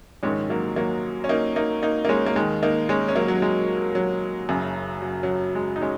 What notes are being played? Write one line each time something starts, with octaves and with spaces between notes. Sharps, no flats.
A#1 G#2 D#3 G#3 C#4
F#3 A#3
F#3 A#3
C#4
A#3 D#4
A#3 D#4
A#3 D#4
A#3
G#3 C#4
A#3
D#2 D#3 G#3
A#3 D#4
G#3 C#4
C#4
F#3 A#3
F#3
G#3
F#3
F#1 F#2 C#3
F#3
F#3
G#3
D#4
G#3 C#4